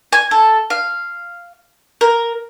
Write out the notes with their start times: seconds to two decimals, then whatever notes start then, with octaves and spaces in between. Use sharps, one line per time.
0.13 G#5
0.31 A4
0.70 F5
2.01 A#4